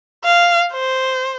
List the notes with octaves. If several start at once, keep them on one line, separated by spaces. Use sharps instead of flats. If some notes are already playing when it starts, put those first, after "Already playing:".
F5
C5